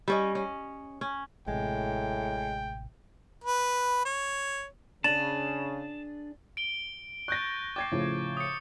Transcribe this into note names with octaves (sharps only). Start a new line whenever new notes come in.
G3 C#4 D#5
C#4
C#4
A1 A2 C3 G#3 G5
B4
C#5
C#3 D4 G#4 A5 A6 D#7 F#7
D7 G7
C#6 F#6 G6 A6 A#6
G5 D6 G#6 A6 C7
A2 C#3 F3
D#6 C#7